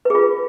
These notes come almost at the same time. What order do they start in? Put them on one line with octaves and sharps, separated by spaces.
B4 G#4 F4